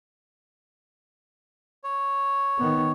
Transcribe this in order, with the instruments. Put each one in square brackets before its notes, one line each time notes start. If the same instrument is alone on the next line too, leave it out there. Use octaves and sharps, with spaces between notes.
[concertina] C#5
[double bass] D#3 B3